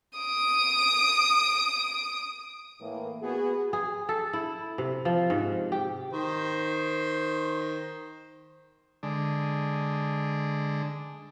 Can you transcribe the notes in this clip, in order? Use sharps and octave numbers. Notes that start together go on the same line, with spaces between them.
D#6 D7
A2 E3 A#3
B3 F#4 G#4
G#4
A4
E4
C3
F3
G#2
G4
D#3 C5
D3 G#3 D4